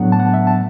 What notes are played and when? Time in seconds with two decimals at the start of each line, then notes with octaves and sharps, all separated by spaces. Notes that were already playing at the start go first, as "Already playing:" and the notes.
Already playing: A2 F#3 B3 D4 F#5
0.12 A5
0.20 F#5
0.34 E5
0.47 A5